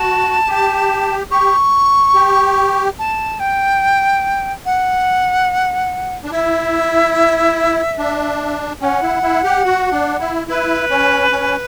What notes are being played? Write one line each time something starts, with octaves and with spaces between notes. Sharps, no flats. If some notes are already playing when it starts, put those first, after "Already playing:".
Already playing: F#4 A5
G4
G4 C#6
G4
A5
G5
F#5
D4
E4 E5
D4
C#4 F#5 G5
E4
E4
G4
F#4
D4
E4
E4 B4
C#4
C#4